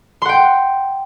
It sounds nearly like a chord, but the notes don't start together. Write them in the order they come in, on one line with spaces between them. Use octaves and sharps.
C6 F#5 G5